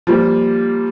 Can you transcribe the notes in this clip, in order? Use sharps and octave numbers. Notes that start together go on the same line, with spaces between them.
F3 G3 A#3